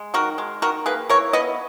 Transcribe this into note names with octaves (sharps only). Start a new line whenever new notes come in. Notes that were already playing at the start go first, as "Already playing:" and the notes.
Already playing: G#3
D#3 F#4 A#4
G#3
D#3 F#4 A#4
A#3 G#4 B4
E3 A#4 C#5
B3 B4 D#5